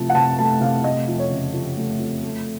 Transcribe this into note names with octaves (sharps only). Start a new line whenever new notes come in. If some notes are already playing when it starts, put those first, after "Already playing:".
Already playing: C3 F3 A3 A5
F#5
C3 A5
A3 A5
C3 F5
A3 D#5
F2
C#5
C#3
F2
A3
F2
A3